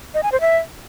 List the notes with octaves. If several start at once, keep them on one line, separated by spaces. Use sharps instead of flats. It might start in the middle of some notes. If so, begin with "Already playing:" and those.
D#5
G#5
C5
E5